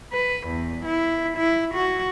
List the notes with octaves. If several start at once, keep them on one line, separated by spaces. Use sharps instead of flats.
B4
E2
E4
E4
F#4